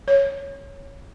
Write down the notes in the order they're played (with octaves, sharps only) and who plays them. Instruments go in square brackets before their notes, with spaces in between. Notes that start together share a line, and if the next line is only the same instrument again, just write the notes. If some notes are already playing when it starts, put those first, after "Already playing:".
[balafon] C#5